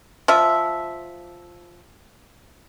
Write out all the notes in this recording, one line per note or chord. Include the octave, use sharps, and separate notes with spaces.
F3 E5